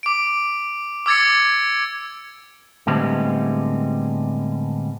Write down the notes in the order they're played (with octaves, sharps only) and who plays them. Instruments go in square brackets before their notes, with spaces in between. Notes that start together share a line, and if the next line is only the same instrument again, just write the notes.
[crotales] D6 D7
D6 E6 G#6 A6 C#7
[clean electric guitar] A2 D3 G3 G#3 B3 C4